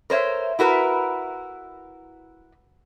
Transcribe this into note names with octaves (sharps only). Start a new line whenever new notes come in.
A#4 C5 C#5 E5
E4 F#4 A#4 B4